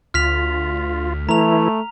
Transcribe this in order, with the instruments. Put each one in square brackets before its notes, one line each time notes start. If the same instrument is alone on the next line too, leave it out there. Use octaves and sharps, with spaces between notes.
[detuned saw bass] D2 [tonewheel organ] F4 [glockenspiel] F6 B6 F7
[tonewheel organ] E3 E4 [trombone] A3 [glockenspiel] A#5 F7